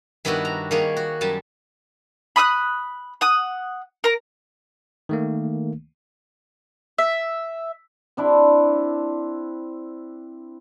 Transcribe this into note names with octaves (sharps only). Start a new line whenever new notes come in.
G2 D#3 B3 D4 E4 F#4
A#5
D#3 G3 A#3 G#4 C#5
F#4
F#2 G3 A5
B5 D#6 E6 F#6
F#5 D#6
A#4 A#5
D#3 A3 A#3
E5
C4 D4 E4